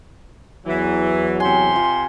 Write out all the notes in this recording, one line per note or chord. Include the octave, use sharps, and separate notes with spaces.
E2 E3 F#3
C3 G#5 C6
F4